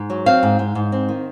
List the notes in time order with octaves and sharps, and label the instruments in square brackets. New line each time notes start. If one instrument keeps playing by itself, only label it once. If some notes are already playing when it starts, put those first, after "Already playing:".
Already playing: [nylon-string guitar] G#2
F#3
C4 F5
G#2
G#2
G#2
C4
D#3